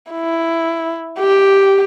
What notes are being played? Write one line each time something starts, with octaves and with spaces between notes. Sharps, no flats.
E4
G4